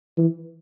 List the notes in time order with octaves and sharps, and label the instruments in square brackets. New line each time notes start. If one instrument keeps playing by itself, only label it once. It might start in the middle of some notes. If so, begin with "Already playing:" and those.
[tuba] E3